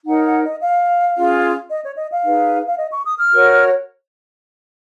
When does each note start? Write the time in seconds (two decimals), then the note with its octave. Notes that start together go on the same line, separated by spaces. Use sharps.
0.06 D#4 A#4 C#5 F#5
0.25 F#5
0.43 D#5
0.60 F5
1.15 C#4 F4 G#4
1.69 D#5
1.82 C#5
1.97 D#5
2.10 F5
2.23 D#4 G#4 B4
2.66 F5
2.77 D#5
2.91 C#6
3.04 D#6
3.17 F6
3.31 F#4 A#4 C#5